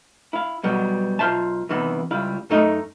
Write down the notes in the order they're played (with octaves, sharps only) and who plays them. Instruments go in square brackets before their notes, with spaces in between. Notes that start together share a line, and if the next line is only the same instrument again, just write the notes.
[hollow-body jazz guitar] E4 F5
B2 F#3 G3 B3
B1 F4 C5 E5 A5
C3 D#3 E3 B3
C#2 G3 E4 F5
F#2 A3 D#4 A#4 D#5